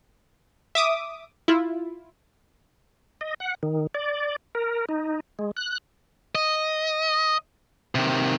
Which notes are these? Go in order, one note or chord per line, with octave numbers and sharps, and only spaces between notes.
E5 D6 D#6
E4 F4
D#5
F#5
D#3
D5
A#4
D#4
G#3
F#6
D#5
C3 D#3